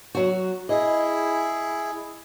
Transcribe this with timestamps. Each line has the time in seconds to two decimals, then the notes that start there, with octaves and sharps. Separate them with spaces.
0.15 F#3 F#4
0.69 E4 G#4 D#5